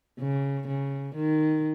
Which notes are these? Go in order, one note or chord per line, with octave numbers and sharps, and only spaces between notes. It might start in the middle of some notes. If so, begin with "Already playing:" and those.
C#3
C#3
D#3